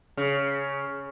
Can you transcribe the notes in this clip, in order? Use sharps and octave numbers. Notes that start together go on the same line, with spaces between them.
C#3